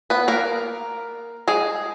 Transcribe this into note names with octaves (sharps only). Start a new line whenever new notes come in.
B3 B4
A#3 A#4
G#3 G#4